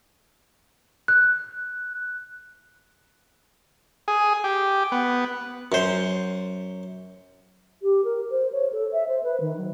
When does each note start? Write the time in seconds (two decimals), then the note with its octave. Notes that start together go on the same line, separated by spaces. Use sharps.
1.08 F#6
4.08 G#4
4.44 G4
4.92 B3
5.72 F#2 C5
7.82 G4
8.04 A#4
8.31 C5
8.52 C#5
8.72 A4
8.92 E5
9.08 C5
9.23 B4
9.40 D#3
9.57 F#3